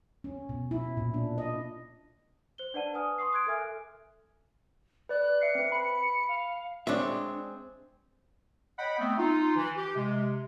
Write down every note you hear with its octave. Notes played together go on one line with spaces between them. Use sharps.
C#4
B2
E4
A#2
D4
D#5
C5 G7
D4 B4 D5 F#5 A5 D#7
B4 G#5 D#6 F6
C6 C#6 D#6 C7
D#6 F#6 G#6 D7
A4 A#4 E5 G#5 F6
B4 D5 F#6
E5 C7 C#7
C4 B4
B5 C#7
F5
G#3 C4 D4 C#5 E5
C#5 D#5 F#5 G5 B5
A3 B3 C4
D#4 F4
E3
G4
C3 G#3